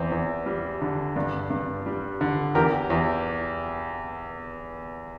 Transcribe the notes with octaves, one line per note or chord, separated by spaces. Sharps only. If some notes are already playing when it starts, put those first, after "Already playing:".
Already playing: E2 C4
E2
G3
D3
G2 D4
G2
G3
D3
E2 G4 A#4
E2